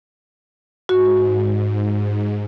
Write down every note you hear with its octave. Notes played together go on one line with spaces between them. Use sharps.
G#2 F#4